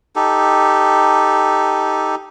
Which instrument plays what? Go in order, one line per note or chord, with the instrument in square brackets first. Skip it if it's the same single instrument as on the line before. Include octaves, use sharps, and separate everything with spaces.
[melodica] D#4 G4 A4